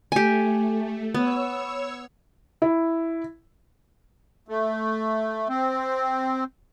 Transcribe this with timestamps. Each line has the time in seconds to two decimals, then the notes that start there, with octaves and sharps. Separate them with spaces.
0.12 A3 G4 G#5
1.14 B3 C#5 E6
2.62 E4
4.48 A3
5.49 C4